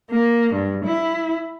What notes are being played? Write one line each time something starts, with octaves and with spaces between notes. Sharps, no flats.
A#3
G2
E4